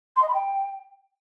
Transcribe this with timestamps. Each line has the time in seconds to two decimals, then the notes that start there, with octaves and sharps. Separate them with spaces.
0.16 C6
0.22 D#5
0.27 B5
0.33 G5